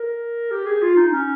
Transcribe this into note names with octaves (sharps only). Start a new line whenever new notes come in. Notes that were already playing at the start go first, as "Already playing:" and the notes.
Already playing: A#4
G4
G#4
F4
D#4
C#4